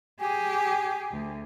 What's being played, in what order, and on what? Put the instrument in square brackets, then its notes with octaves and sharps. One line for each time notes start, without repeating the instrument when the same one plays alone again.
[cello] G4 G#4 [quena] G#5
[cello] D2